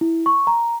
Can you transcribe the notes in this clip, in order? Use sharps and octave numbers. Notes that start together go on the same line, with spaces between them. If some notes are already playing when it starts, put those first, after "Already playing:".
E4
C#6
A#5